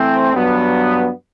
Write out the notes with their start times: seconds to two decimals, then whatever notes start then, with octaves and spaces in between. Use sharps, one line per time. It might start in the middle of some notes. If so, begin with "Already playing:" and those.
Already playing: E3 A3 C4
0.33 G2 F#3 B3